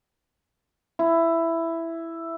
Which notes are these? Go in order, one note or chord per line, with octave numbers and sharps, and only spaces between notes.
E4